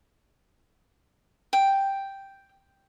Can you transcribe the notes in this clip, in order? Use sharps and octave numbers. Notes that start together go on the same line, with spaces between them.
G5